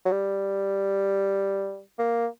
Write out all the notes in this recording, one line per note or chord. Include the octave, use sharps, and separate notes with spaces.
F#3
G3
A#3